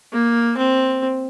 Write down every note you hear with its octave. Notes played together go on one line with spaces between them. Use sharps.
A#3
C4